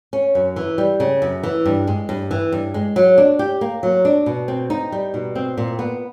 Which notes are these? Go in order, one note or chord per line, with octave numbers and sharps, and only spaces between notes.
C#4
F#2
E3
G3
C#3
F#2
E3
G2
G#3
G2
E3
G2
G#3
F#3
D4
G4
A#3
F#3
D4
B2
C4
D#4
G3
B2
C4
A#2
B3